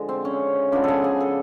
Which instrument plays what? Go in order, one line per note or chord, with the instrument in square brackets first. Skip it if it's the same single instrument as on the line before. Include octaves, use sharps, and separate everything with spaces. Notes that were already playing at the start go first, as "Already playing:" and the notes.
Already playing: [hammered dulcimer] D3 F3 G#3
C4
C#4
C#3 F3 G#3 B3 D4
G#4 A4
G#4
A4